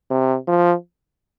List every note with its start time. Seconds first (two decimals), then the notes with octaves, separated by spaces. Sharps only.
0.11 C3
0.48 F3